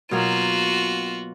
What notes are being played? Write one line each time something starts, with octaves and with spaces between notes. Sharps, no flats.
B2 F#3 A#3 F4 F#4